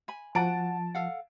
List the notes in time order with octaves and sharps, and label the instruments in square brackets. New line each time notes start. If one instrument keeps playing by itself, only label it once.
[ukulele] G#5 B5
[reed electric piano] F3 [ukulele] F#4 F#5 G#5 [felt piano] A5 D7
[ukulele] A4 F5 F#5